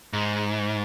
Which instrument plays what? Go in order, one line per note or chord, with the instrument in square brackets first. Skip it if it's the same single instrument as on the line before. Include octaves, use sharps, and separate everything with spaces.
[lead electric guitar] G#2